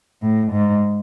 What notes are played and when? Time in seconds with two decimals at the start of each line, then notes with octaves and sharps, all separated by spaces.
0.22 A2
0.52 G#2